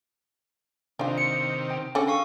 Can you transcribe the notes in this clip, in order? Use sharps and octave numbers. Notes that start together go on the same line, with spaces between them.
C3 D#3 D4 F4
C#7
G5
D3 C#4
A4 F5 C#6